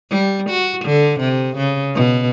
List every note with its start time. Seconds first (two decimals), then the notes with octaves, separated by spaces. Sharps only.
0.10 G3
0.50 F#4
0.85 D3
1.20 C3
1.57 C#3
1.95 B2